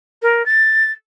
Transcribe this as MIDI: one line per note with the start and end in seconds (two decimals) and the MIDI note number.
0.22 0.45 70
0.46 0.91 93